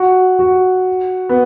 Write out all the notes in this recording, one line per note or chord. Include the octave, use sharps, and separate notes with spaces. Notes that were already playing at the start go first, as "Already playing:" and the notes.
Already playing: F#4
F#4
B3